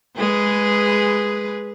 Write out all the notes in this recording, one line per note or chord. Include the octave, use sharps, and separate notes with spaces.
G#3 G#4 B4